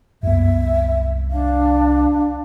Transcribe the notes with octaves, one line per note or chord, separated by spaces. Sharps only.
C2 F#2 B3 E5
D4 F5